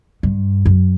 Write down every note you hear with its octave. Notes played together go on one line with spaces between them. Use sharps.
G2
F#2